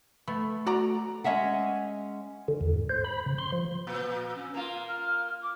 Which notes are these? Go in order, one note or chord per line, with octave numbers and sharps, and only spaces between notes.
A3 B3
F#4 D5 F#5 A#5
G#3 C#4 D#5 E5 F#5
D3
E2
G#2
C5
B5
C#3
C6
F3
A#2
C#4
A#3 F4 A#5
F6
D6